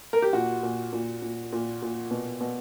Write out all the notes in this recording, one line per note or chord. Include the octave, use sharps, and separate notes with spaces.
A#4
G4
A#2 F#4
A#2
A#2
A#2
A#2
A#2
B2
B2